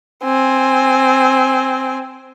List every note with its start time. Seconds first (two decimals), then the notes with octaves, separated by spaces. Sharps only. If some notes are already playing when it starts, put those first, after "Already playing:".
0.24 C4 G#5